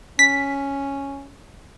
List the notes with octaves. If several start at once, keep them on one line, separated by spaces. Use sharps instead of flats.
C#4 B6